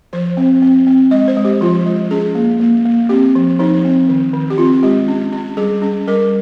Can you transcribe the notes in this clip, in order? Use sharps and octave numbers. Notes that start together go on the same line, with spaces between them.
F3 C5
C4
C4
C4
G#3 D#5
C5
G#3
G4
F3 F4
G#3
C#4 G#4
A#3
A#3
A#3
C4 G4
F3
F3 D#4
C4
D#3
D#3
G4
C4 F4
G#3 G4
C#4
C#4
G3 G#4
C#4
G3 A#4